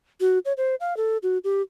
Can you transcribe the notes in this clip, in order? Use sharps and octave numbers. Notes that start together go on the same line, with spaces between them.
F#4
C#5
C5
F5
A4
F#4
G4